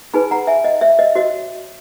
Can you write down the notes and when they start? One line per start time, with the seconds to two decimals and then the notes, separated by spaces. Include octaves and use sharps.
0.14 D#4 G#4 B4 G#5 B5
0.31 F#5 A#5
0.47 E5 G#5
0.64 D#5
0.81 C#5 E5
0.99 D#5
1.15 F#4 C#5 D#5